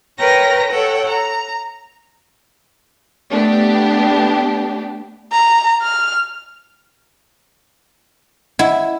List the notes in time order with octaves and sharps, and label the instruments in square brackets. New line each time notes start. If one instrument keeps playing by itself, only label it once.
[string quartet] A#4 B4 C#5 G5 A#5 A#6
A4 C#5 F#5 G5
A#5
[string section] A3 B3 D4 G4
[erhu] A#5
F6
[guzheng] E4 [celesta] D#5 F#5 G#6